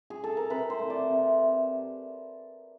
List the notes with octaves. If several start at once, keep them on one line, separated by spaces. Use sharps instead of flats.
G#4
A4
A#4
C3 B4
C5
E3 A3
D5
C3